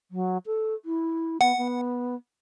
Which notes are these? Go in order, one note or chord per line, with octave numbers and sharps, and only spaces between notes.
F#3
A4
E4
B3 F#5
B3